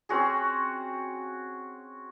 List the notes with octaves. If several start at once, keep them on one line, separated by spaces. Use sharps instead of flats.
C4 C#4 F#4 G#4